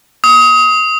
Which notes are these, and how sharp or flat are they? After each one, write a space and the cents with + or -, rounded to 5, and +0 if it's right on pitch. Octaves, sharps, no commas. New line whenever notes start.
D#6 +25